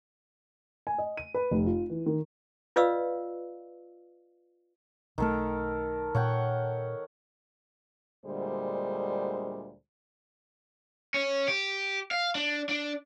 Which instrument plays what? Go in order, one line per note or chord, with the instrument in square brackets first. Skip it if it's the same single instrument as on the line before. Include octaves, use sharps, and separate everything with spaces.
[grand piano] G#5
D#5
D#7
B4
F1
F4
E3
D#3
[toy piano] F4 B4 D5 D#5 F5 E6
[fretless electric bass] B1 A3 [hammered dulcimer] D#3 A4 A#4
[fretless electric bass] A#2 [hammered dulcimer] C#5 F#5 G5
[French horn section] D2 A#2 D3 G3 G#3 C5
[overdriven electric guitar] C#4
G4
F5
D4
D4